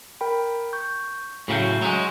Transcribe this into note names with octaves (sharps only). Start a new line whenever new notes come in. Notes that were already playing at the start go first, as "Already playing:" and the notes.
A#4 G5 B5
C#6 G6
A2 C#3 F#3 F#4 F6 G6
F#3 G#3